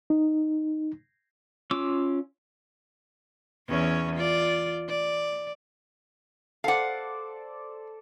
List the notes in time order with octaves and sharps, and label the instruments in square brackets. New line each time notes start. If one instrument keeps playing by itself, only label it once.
[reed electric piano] D#4
[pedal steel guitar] C#4 F4 D6 E6
[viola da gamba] E2 C#4 C#5
F4 D5
D5
[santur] A4 C5 D5 [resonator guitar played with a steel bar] F5 F#5